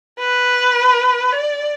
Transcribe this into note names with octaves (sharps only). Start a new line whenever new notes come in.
B4
D5